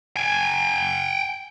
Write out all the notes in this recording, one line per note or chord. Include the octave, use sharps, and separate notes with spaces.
G5 G#5